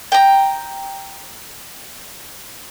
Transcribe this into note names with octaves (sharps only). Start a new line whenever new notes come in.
G5 A#5